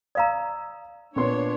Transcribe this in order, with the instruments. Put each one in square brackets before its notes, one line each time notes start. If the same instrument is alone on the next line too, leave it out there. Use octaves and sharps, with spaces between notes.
[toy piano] D5 F5 A#5 [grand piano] D#6 E6
[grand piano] A#2 B3 C6 [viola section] D4 C#5